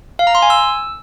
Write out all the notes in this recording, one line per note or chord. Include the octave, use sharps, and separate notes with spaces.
F5
A#5
C6
G#5
E6